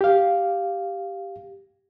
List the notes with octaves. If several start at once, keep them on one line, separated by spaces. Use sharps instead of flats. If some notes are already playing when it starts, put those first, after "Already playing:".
G4 F5